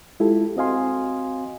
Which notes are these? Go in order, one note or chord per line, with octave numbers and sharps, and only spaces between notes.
G#3 E4 F4 G4 A4
C4 F#4 D#5 F5 G#5 C6